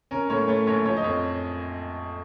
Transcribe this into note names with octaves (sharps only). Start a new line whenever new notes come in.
C#4 A#4
A2 C#5
A3 C#5
A#1 C#5
F3 C#5
D#5
F2 C#5